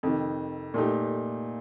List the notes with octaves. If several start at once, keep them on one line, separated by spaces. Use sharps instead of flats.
F2 C3 D#3
A#2 A3 D#4 G4